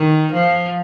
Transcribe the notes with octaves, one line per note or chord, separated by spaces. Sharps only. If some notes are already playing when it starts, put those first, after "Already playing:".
Already playing: D#3
F3